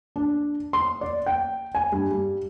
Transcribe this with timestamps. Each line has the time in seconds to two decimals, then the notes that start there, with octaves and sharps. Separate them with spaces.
0.16 D4
0.73 C6
1.01 D5
1.26 G5
1.75 G#5
1.92 G2
2.11 G3